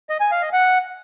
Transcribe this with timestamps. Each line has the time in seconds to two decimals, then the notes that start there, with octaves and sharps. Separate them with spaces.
0.10 D#5
0.20 G#5
0.31 F5
0.42 D#5
0.53 F#5